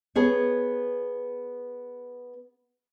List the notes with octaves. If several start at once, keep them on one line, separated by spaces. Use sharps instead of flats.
B3 G#4 C#5